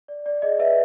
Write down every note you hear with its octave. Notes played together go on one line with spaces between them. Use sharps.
D5
D5
G#4 D#5
B4 E5